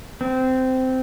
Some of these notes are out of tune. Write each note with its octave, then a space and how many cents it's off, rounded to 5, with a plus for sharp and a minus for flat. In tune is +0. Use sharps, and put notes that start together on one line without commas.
C4 -15